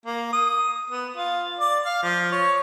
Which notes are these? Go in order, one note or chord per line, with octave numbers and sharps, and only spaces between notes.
A#3
D#6
B3
F4
D5
F5
F3
C#5